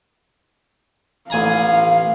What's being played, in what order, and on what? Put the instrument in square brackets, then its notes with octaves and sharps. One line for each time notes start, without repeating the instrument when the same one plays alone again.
[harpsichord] A1 G#5 A#5 [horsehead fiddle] F5